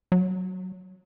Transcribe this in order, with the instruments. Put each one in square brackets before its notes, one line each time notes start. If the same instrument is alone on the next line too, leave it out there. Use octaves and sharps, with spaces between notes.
[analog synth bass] F#3